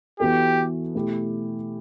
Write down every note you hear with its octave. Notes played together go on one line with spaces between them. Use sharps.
E3 B3 F#4 G4 A4
B2 A3 E4 G4